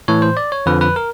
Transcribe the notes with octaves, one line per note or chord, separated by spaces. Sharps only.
A2 E3 C#5
C5
D5
C#5
F2 D3 F3 B4
B4
A#4